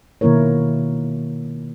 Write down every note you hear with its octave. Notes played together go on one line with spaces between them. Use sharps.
B2 D#3 A#3 E4 A#4 C#5